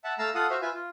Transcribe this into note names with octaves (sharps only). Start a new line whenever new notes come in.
E5 F#5 A5
A3 F5 A5 A#5 E6
F4 A4 F5 F#5 D#6
F#4 C5 E5 F5
F4 B4 E5 G#5
F4